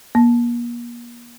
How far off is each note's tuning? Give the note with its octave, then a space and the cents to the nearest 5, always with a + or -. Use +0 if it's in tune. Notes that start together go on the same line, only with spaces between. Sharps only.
A#3 +40